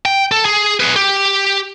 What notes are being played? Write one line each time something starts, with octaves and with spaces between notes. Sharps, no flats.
G5
A4
G#4
G#4 B4
G4